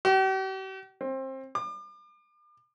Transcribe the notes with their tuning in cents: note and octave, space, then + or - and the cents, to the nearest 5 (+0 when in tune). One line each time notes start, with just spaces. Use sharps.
G4 -45
C4 +25
D6 +40